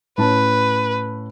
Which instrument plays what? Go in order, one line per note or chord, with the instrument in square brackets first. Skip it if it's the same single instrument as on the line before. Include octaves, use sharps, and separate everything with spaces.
[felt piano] A2 C#4 A5 [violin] B4